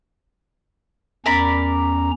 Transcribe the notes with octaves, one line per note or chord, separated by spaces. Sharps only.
E2 C#4 A#4 D5 A#5 B5